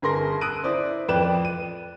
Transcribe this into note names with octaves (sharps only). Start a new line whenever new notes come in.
G1 G#4 A#4 C6 A#6
D#6 E6 F#6 D7 D#7
E4 C5 D5
F2 B4 D5 G5 F#6 E7
D#7